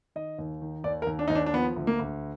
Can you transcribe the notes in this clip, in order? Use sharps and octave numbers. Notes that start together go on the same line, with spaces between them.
D#3 D#5
D#2
D#3
D#2 D5
A#4
D#2
D4
D#2 D#4
D4
D4
F3 B3
D2
A#3
D2